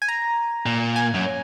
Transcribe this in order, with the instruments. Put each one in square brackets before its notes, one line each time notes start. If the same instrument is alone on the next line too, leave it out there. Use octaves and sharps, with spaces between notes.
[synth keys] G#5
A#5
[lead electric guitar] A#2
[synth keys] G#5
[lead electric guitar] F#2